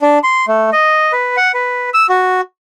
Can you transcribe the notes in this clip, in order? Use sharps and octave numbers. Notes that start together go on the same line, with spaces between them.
D4
C6
A3
D#5
B4
F#5
B4
E6
F#4